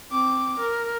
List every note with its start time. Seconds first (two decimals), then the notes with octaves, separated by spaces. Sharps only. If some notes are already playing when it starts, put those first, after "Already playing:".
0.12 C4 D6
0.59 A#4